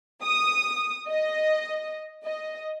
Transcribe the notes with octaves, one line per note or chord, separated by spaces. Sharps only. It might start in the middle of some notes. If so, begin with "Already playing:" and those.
D#6
D#5
D#5